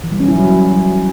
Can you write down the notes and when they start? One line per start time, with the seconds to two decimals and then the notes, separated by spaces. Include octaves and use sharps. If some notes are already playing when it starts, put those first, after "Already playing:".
0.04 E3
0.12 G3
0.20 C#4
0.28 E4
0.36 F#3